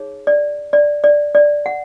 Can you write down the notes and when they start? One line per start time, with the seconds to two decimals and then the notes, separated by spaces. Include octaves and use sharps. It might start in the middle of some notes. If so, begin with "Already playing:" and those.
Already playing: D#4 G#4 C#5
0.27 D5
0.73 D5
1.04 D5
1.35 D5
1.66 F#5